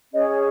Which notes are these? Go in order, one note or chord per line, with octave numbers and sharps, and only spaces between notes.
C#4 G#4 C#5 D#5